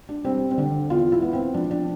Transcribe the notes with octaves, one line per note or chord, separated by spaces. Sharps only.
D4
G3 C4
C4
D3 D4
E2 F4
E4
B3
C4
F3 D4
D4